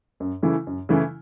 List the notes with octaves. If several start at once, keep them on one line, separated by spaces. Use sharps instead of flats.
F#2
C#3 E3 A3 E4
F#2
C#3 E3 A3 E4